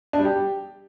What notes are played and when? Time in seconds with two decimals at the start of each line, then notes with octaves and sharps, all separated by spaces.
0.13 D4
0.19 G3
0.25 G4